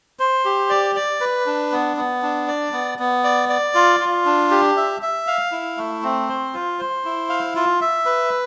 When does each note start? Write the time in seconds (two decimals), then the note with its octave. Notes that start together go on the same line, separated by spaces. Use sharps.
0.19 C5
0.45 G4
0.70 D5
0.96 D5
1.21 B4
1.46 D4
1.72 B3
1.97 B3
2.23 D4
2.48 D5
2.73 B3
2.99 B3
3.24 D5
3.49 D5
3.75 F4
4.00 F4
4.25 D4
4.51 G4
4.77 E5
5.02 E5
5.27 F5
5.52 E4
5.77 A3
6.03 C4
6.29 C5
6.54 F4
6.79 C5
7.05 E4
7.29 F5
7.56 F4
7.81 E5
8.06 B4